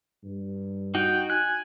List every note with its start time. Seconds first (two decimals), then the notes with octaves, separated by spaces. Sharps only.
0.24 G2
0.95 D#4 F#4 G5
1.30 G#5 F#6